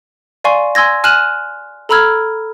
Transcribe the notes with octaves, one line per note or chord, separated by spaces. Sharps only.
D5 F5 G#5 C6 C#6
G#5 C6 E6 G#6 A#6
G#5 F6 F#6 D#7 E7 F#7
A4 A#5 B5 E6 F6 G#6